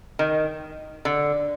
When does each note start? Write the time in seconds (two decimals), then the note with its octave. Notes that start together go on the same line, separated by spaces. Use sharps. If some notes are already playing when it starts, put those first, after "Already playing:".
0.19 D#3
1.05 D3